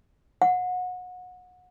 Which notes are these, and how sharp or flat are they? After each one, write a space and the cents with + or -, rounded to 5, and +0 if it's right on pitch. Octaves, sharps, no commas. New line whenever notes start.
F#5 -30